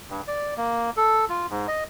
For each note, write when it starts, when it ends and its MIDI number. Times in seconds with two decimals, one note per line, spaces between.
0.10 0.21 43
0.28 0.54 74
0.57 0.90 58
0.97 1.25 69
1.29 1.47 65
1.51 1.67 44
1.68 1.84 75